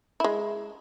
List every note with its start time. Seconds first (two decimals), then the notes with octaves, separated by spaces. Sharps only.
0.20 G#3 E4